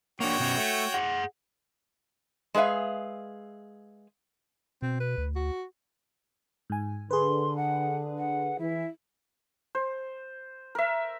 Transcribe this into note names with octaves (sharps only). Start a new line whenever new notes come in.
A#3 D4 F#4 C#5 G5
B2 B3 C#4
A3
G#4 F#5
G#3 G#4 B4 E5 F5
B2 C4
B4
D2
F#4
G#2 G#5
D3 G#4 B4 C6
F#5
F#5
E3 E4
C5
A#4 E5